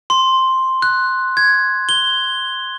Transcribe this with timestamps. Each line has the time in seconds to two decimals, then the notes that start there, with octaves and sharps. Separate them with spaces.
0.10 C6
0.82 F#6
1.37 G#6
1.89 G7